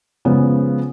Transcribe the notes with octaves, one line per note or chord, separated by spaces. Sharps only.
C#3 F3 G#3 B3